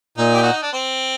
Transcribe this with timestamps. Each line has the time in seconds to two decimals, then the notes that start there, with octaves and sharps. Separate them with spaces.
0.18 A#2 D#4
0.34 G4
0.43 F#4
0.53 D#4
0.62 D4
0.73 C4